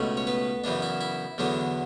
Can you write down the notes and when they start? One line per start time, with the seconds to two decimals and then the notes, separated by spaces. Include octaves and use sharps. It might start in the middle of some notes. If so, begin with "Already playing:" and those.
Already playing: C#2 B2 A3 C#4
0.17 C#5
0.27 B3 B4
0.64 F#2 C#3 E3 B3 D4
0.82 E4
1.01 E4
1.38 E2 D3 F#3 B3 D4